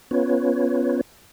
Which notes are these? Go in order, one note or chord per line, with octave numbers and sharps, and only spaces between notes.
B3 C#4 F4 B4 C#5